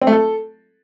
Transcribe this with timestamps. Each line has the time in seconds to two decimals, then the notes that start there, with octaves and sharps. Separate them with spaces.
0.02 C4
0.07 A3
0.13 A4